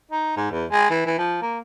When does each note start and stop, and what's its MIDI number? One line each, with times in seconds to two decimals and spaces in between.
0.11 0.32 63
0.37 0.47 44
0.51 0.65 40
0.71 0.88 56
0.91 1.06 52
1.06 1.15 52
1.18 1.40 53
1.42 1.59 58